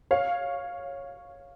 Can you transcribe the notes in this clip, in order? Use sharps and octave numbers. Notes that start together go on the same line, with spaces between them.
C#5 F5